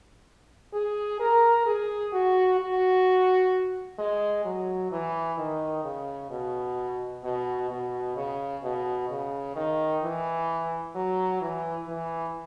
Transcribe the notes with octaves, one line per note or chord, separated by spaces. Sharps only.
G#4
A#4
G#4
F#4
F#4
G#3
F#3
E3
D#3
C#3
B2
B2
B2
C#3
B2
C#3
D#3
E3
F#3
E3
E3